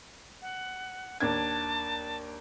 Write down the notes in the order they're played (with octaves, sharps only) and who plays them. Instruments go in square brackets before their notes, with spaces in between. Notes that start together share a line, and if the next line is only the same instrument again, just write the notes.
[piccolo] F#5
[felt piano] D#2 D4 G#6 [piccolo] A5